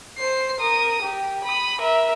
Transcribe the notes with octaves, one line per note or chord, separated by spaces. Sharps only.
C5 C7
A#4 D#6
G4
B5 D#6
A#4 E5